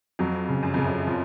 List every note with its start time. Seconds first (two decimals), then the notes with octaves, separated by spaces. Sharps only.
0.19 F2 F#3
0.49 C#3
0.63 F#2
0.74 F2 C#3
0.85 F#2
1.07 F3